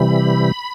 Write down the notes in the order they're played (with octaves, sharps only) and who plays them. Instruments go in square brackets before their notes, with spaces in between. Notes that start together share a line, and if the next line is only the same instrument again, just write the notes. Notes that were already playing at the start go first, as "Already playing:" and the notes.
Already playing: [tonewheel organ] C3 E3 G3 B5